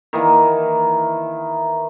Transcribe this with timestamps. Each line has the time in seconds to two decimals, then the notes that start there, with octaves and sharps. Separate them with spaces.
0.13 D#3 E3 A#3